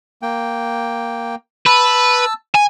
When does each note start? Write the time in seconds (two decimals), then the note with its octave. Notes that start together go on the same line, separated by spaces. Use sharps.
0.22 A#3 G5
1.66 B4 A5 E6
2.55 G#5